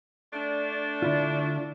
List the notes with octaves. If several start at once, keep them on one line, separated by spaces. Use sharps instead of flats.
A3 D4
D3 E4 F4